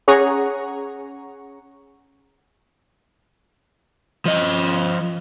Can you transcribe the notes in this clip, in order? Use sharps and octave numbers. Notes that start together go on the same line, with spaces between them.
C#4 G#4 C#5 F#5 A#5 C#6
F3 D#5